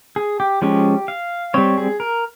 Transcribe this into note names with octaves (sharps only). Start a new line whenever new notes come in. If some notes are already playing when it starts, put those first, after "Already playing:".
G#4
G4
F3 G#3 C#4 G4
F5
G3 C4 C#5
G#4
A#4